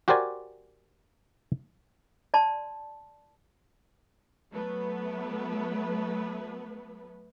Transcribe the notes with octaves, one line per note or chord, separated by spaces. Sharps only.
F#4 G4 A#4 C5 D5 G#5
D5 A5 C6
F#3 A3 B3 B4